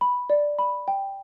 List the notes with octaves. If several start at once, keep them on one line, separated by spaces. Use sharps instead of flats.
B5
D5
B5
G5